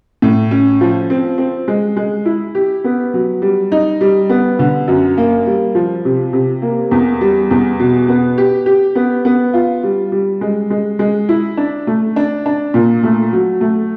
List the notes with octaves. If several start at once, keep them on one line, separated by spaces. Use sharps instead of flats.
A2
C#4
F3
C4
C4
G#3
G#3
E4
G4
B3
F#3
G3
D#4
G3
B3
D3
F#2
A#3
G3
F3
C3
C3
A#3
E2
G3
E2
B2
B3
G4
G4
B3
B3
F4
G3
G3
G#3
G#3
G#3
E4
D4
A3
D4
D4
A#2
A3
F#3
A3